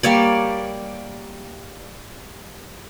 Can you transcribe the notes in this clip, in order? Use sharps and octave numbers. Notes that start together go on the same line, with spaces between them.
G3 A#3 C#5 D5